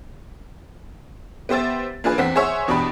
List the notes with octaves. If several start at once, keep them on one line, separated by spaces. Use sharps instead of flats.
B3 G4 C5 E5 A6
A#3 D4 F4 G#4 B4
E2 C4 F#5 B6
G#4 C5 C#5 E5 F#5
E2 B2 D4 G4 B5